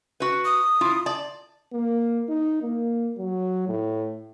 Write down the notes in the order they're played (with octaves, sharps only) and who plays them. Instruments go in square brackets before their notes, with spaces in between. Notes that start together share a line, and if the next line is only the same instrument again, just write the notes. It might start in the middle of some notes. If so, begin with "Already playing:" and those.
[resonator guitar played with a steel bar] F#4 B4
[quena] D#6
[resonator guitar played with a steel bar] E4 F4
D5 A5
[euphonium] A#3
D#4
A#3
F#3
A2